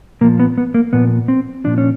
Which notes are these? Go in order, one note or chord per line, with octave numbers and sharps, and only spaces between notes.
A#2 F3 A#3
B3
B3
A#3
A#2 F3 B3
C4
A#2 F3 D4
C#4